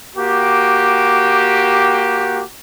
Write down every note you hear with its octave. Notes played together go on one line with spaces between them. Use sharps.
A#3 F#4 G4